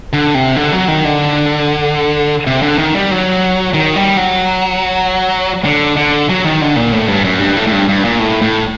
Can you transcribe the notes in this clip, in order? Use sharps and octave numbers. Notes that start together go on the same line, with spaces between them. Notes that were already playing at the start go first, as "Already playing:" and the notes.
D3
C3
D3
F#3
D#3
D3
C3
D3
D#3
G3
F#3
D#3
G3
F#3
D3
D3
F#3
D#3
D3
A#2
A2
G2
F#2
G2
A2
A2
G2
G2
A#2
A2
A2